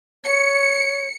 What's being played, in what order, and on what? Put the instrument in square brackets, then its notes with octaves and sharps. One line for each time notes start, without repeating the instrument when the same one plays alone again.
[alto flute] C#5 [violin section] C#7